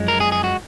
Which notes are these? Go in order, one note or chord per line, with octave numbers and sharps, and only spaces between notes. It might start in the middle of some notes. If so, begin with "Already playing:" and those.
Already playing: F#2 F3 G#3
A#4
G#4
G#4
F#4